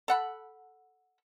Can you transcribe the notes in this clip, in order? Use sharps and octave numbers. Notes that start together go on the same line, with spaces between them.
A4 F#5 B5